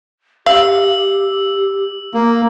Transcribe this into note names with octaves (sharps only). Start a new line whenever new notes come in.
G4 F5 E6
A#3